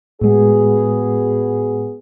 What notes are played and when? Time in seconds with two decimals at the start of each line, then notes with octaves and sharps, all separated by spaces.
0.21 A2 G#3 B3 F#4 G#4